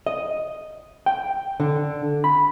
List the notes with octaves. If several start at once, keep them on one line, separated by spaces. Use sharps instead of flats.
D#5
G5
D3
B5